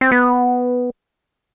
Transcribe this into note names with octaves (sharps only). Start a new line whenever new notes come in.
C4
B3